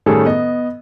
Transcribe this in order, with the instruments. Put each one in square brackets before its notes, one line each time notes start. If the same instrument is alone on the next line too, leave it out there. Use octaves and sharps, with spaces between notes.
[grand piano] A2 D#3 G3 C#4 G#4 A4
B3 D#5